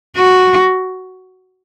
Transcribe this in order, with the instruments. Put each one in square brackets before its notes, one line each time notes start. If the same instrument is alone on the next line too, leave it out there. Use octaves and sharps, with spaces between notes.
[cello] F#4